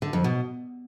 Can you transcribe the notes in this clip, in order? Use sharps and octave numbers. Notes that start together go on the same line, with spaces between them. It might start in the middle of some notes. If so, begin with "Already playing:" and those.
D3
F2
B2